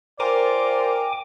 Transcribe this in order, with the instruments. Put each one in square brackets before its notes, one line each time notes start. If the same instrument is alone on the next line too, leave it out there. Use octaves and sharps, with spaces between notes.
[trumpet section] F4 D5 [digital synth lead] A#4 [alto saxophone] C5 [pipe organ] G5 G#5 D6